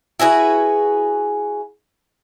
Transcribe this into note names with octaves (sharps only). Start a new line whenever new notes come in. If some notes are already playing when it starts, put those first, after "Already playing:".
E4 F#4 G#4 B4